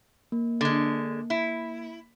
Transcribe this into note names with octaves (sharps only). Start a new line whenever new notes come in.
A#3
D3 G#3
E4